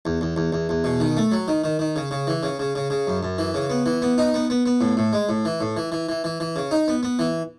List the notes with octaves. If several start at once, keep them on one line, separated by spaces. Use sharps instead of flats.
E2
E2
E2
E2
E2
B2
D#3
A3
F#3
D#3
D#3
D#3
C#3
C#3
E3
C#3
C#3
C#3
C#3
F#2
F#2
E3
C#3
B3
E3
B3
D#4
B3
B3
B3
A2
A2
G#3
A2
E3
A2
E3
E3
E3
E3
E3
C#3
D#4
B3
B3
E3